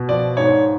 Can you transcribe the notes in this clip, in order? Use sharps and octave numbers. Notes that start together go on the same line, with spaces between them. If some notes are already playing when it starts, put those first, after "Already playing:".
Already playing: B2
F3 D5
G#2 C#5